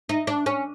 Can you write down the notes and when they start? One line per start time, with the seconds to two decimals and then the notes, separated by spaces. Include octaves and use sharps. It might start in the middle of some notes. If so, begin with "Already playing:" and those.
0.09 D#4
0.27 D4
0.46 C#4